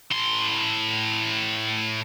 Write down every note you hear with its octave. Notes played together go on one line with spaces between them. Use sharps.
A2 C6